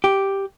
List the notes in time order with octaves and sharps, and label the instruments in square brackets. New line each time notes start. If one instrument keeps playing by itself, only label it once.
[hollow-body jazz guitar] G4